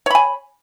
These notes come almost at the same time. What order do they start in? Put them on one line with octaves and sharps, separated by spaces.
C#5 B5 G#5